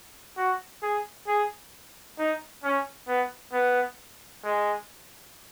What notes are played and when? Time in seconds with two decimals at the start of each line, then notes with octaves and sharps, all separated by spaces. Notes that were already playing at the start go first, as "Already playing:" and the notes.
0.37 F#4
0.82 G#4
1.28 G#4
2.18 D#4
2.64 C#4
3.08 B3
3.53 B3
4.44 G#3